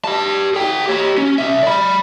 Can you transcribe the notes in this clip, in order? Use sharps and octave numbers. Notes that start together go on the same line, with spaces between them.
G4 A5
G#4 G5
G4 C#5
C#4
C2 E5
D5 B5